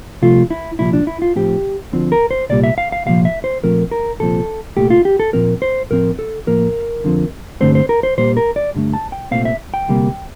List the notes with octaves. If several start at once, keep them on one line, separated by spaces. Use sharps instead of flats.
C2 C3 F3 A3 F4
E4
C2 A#2 F3 E4
D4
E4
F4
A2 F3 C4 G4
D2 D3 F3 C4
A#4
C5
C2 A#2 G3 D5
E5
F5
F5
C2 A#2 F3 F5
E5
C5
A#2 F3 A3 C4 A#4
A#4
C2 A#2 F3 C4 A4
C2 A#2 A3 G4
F4
G4
A4
A#2 F3 C4 A#4
C5
A2 F3 C4 A#4
A4
A2 F3 A#3 A#4
F2 D3 F3 C4
G2 D3 A3 C4 C5
C5
A#4
C5
A#2 G3 A#3 C5
A#4
D5
G2 D3 A3
A5
G5
C2 A#2 A3 C4 F5
E5
G5
D2 C3 G3 A#3